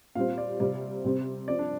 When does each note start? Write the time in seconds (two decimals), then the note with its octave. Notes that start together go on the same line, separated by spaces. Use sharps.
0.15 A#2 G3 C4 F5
0.38 D5
0.60 C3 G3 C4 D5
1.04 C3 G3 C4
1.48 F3 C4 D5
1.59 D4